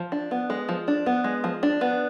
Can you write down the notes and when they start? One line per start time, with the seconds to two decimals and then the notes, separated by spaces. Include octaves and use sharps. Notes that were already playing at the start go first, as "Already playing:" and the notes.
Already playing: F3
0.12 D4
0.31 B3
0.50 G#3
0.69 F3
0.88 D4
1.06 B3
1.24 G#3
1.44 F3
1.63 D4
1.81 B3